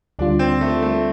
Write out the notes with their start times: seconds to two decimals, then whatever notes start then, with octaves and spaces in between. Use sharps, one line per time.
0.19 D2 D3 G3 D4 F4
0.39 C4
0.61 A3
0.82 A3